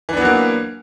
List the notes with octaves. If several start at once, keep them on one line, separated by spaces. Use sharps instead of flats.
E3 F#3 A#3 B3 D4